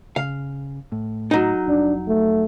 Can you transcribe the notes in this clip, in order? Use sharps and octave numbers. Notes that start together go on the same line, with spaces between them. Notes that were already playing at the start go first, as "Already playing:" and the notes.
C#3 F5
A2
F#3 D#4
F1 D4
A3